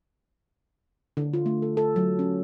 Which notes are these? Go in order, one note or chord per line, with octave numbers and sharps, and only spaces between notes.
D3
F4
A3
A4
A4
F#3
C#4